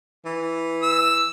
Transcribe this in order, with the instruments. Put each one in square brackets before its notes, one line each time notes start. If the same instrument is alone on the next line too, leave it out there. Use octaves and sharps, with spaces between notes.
[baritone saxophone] E3
[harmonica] E6